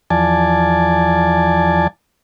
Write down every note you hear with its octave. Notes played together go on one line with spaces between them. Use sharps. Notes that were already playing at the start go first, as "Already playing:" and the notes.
E2 F3 D5 G#5 A5